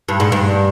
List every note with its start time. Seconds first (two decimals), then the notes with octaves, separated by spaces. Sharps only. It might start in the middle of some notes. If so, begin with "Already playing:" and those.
0.09 G2
0.20 G#2
0.32 G2